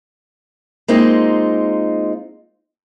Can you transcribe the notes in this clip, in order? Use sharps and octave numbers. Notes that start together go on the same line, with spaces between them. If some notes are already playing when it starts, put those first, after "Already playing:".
G#3 A#3 C4 D#4 F4